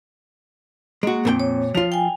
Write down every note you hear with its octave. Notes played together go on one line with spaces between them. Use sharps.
G#3 A#3 F#4
F2 A#2 A#4 G5
C#5
F3 F4 F7
G5 G#5